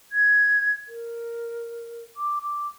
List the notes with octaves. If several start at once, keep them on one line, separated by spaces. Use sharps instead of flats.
G#6
A#4
D6
D6